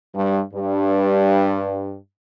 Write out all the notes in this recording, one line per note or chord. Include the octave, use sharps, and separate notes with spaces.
G2
G2